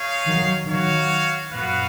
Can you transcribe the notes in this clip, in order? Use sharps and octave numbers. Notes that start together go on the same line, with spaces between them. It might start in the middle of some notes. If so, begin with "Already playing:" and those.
Already playing: D#4 G#4 C#5 F5
D#3 F#3
D#3 F#3 F#4 C#5 F5
F#2 A#2 B3 F#4 B4 F5